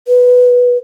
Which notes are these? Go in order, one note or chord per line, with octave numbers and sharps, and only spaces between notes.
B4